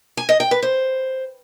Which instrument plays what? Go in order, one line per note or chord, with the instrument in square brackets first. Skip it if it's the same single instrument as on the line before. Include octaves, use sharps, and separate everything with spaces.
[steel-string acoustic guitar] G#5
D#5
G5
B4
C5